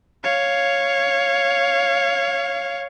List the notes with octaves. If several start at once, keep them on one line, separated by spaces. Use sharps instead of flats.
C#5 F5